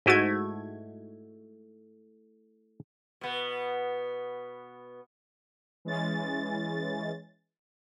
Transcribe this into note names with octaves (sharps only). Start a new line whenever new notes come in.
G#2 A3 E4 F#4 D#5 G#6
B2 B3
E3 G#3 C#4 A6